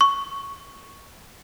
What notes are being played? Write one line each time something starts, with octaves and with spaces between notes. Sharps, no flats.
C#6